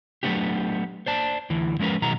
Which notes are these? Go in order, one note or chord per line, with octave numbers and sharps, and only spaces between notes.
F#3 G#3 A3 B3 D4 G4
C5 D5 A5
D2 E3
F3 G#3 C#4 A#4 B4
B2 D#3 F#3 G#3 B3 A#5